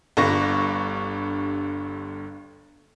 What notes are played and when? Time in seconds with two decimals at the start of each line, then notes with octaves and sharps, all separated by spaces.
0.17 G1 G2 D3 C#6 A#6